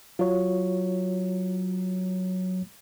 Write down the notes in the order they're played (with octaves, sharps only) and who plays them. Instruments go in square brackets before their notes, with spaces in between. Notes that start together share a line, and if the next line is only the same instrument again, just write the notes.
[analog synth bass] F#3 [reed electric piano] F4 F#4 C#5